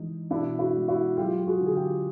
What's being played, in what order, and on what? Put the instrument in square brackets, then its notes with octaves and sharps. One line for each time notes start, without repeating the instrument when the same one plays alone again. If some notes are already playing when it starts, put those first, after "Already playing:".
Already playing: [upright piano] E3 G#3 D#4
B2 D4 E4
E4 F#4
G#3
E4 F#4
F#3 F4 G4
G4
F#4 G#4
D3
G#4
F4 G4